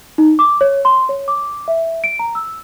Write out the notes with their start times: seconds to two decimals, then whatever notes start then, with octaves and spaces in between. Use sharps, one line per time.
0.18 D#4
0.39 D6
0.61 C#5
0.85 C6
1.09 C#5
1.28 D6
1.68 E5
2.04 D7
2.19 A#5
2.35 E6